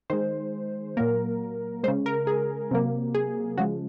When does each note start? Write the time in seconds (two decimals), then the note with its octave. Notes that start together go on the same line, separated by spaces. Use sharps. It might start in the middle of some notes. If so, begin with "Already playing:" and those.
0.10 D#3 G#3 C5
0.97 A#2 F#3 A#3 A#4
1.83 G#3 C5
1.88 C#3
2.06 A#4
2.27 G#4
2.71 C3 F#3 A#3
3.15 G#4
3.58 C#3 F3 G#3 F#4